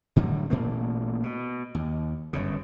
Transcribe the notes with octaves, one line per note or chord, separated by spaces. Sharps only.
A2 D3 F#3 G3
A1 A#2 A3 A#3
B2
D#2
G1 F#2 C#3